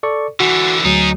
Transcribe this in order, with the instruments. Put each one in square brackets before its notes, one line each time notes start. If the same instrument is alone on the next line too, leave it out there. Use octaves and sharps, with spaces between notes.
[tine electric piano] A4 D5 C#6
[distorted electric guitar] D3 E3 [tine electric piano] F#4
[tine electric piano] D2 F#3 [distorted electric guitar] D#4 G#4